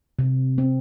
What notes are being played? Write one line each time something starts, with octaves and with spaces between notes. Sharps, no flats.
C3
C4